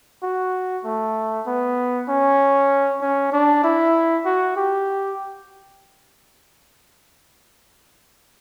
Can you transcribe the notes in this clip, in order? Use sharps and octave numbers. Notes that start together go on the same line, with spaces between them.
F#4
A3
B3
C#4
C#4
D4
E4
F#4
G4